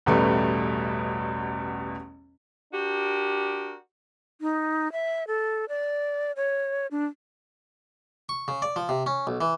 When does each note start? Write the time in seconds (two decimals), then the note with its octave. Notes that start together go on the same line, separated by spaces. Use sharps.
0.06 A1 E2 B2 G3 A3
2.72 D4 F#4 G4 A#4
4.41 D#4
4.92 E5
5.27 A4
5.69 D5
6.36 C#5
6.91 D4
8.29 C#6
8.48 C#3
8.62 D5
8.76 F3
8.89 C3
9.06 C#4
9.27 B1
9.41 E3